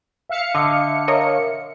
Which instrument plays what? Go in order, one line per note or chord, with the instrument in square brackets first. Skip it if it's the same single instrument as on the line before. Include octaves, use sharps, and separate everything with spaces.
[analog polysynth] E5 F5 C#7
[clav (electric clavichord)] D3 [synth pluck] D#5
[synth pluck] A#4 C#5 D#5